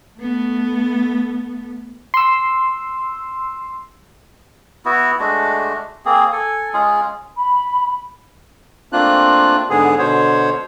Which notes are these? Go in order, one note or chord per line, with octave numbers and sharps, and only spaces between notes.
A3 B3
C6 E6
B3 E4 F#4
G#3 A3 D4 F#4
A#3 C4 G#4
A4 G#5
G#3 C#4 F4 G#4
B5
A3 A#3 C4 D4 F4 F#6
G#2 D3 B3 G#4
B2 D3 C5 C#5